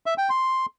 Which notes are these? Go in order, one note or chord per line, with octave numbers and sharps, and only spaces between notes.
E5
G5
C6